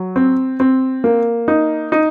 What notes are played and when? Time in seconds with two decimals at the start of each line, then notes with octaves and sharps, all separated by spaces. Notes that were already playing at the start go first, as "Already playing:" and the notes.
Already playing: F#3
0.16 C4
0.60 C4
1.04 A#3
1.48 D#4
1.92 D#4